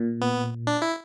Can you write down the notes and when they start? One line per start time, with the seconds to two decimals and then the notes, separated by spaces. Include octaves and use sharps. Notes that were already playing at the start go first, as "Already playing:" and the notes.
Already playing: A#2
0.21 B3
0.67 D4
0.82 E4